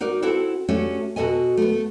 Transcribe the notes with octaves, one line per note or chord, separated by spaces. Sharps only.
D#4 F#4 A#4 D5
C4 E4 F#4 A4 F#5
A3 C#4 D4 F#4 G4 A4
B2 F#4 A4 D#5 G#5
A3 B3